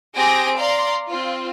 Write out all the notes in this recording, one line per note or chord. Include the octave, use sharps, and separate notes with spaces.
C4 G4 G#4 G#5 A#6 D7
D5 F5 A#5 C6
C4 F4